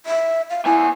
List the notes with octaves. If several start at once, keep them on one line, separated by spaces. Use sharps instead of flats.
E5
F5
B3 E4 G#5